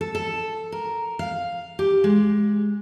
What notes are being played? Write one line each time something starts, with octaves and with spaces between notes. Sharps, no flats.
A4
A4
A#4
F5
G4
G#3